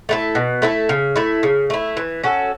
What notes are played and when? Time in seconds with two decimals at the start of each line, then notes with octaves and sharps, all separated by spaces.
0.09 A3 E4 A4
0.35 B2
0.62 A3 E4 A4
0.89 C#3
1.16 A3 E4
1.43 C#3
1.70 A3 E4
1.97 E3
2.23 C#4 F#4 A4